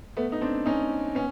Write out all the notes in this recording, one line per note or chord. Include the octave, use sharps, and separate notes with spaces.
A3 B3
D#4
C4 D4
C#4 D#4
B3 C#4